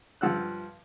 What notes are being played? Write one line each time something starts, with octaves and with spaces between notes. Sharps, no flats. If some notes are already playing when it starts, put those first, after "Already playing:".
G2 F3 F#5 E6 F#6